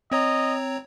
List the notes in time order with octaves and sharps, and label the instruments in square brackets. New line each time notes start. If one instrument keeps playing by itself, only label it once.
[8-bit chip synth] C4 C#5 A#5 [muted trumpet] D#5